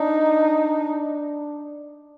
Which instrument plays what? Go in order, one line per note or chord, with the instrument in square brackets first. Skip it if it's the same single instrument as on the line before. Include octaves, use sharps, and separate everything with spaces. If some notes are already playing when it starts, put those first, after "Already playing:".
Already playing: [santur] D4 [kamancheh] D#4